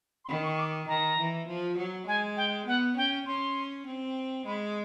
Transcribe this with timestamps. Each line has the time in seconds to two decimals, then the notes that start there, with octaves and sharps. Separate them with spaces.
0.25 C6
0.29 D#3 B5
0.43 C#6
0.55 C#6
0.59 D6
0.88 D#3 A#5
1.19 E3
1.48 F3
1.78 F#3
2.07 G#3 G#5
2.37 G5
2.67 B3 F#5
2.97 C#4 G5
3.26 C#4 C6
3.86 C4
4.46 G#3 B5